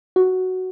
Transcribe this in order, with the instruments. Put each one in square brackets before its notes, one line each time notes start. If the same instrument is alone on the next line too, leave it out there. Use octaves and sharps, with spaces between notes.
[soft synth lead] F#4